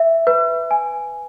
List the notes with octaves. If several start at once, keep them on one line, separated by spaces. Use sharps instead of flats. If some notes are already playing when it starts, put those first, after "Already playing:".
Already playing: E5
B4
G#5